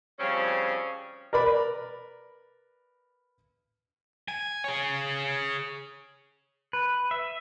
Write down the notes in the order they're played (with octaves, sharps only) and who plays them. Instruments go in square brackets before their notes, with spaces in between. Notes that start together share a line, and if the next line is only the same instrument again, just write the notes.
[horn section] C#3 F3 G3 C4 C#4
[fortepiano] A#4 B4 D5 B5
[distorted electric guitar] G#5
G#4 C#5
[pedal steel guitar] B4
E5